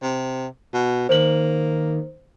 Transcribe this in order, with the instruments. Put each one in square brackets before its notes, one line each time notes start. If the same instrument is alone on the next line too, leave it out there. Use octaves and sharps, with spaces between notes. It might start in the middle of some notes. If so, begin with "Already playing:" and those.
[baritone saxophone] C3
B2
[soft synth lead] D#3 [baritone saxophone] A#3 [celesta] C5 F#7